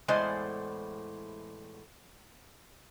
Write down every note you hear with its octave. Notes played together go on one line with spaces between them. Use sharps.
E2 A2 G#3 C5 D5 G#5